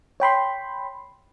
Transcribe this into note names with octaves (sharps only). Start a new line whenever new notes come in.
C#5 G5 B5 C6